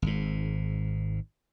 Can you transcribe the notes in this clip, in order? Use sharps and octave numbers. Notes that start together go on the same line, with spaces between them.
G#1 G#2